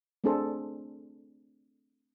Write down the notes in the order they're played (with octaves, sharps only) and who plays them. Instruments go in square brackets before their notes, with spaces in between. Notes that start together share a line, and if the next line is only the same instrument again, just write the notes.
[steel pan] A3 C4 D4 G#4 A4 C5